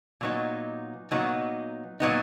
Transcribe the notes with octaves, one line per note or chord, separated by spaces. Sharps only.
A#2 F#3 B3 D#4
A#2 F#3 B3 D#4
A#2 F#3 B3 D#4